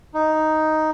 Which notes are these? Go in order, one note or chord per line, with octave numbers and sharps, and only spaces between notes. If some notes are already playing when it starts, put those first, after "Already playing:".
D#4